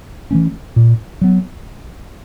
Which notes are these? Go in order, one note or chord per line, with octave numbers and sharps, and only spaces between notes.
E3 A3 C#4
A#2
F#3 B3